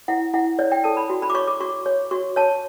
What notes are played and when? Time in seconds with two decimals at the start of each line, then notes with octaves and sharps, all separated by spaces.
0.08 E4 F#5
0.34 E4 F#5
0.59 C#5 D5
0.72 G5
0.84 A4 A5
0.97 B5
1.10 F#4
1.22 B5
1.30 D6
1.34 C#5 C#6
1.48 D6
1.61 F#4 C#6
1.86 C#5
2.11 F#4 C#6
2.36 C#5 A5